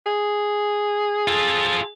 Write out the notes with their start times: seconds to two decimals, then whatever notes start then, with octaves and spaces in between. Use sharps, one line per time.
0.06 G#4
1.28 F4 A4